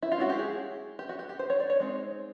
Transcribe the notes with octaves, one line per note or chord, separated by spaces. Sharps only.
E4
F4
G#3 C#4 E4 F#4
G4
G#4
G4
F#4
G4
G4
C5
C#5
D5
C#5
G#3 C4 D#4